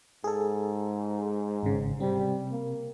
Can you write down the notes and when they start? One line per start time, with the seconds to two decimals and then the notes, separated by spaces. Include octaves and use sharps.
0.24 G#2 G#4 A4
1.63 G#1 C#3
2.00 C3 G3 C4
2.52 A#3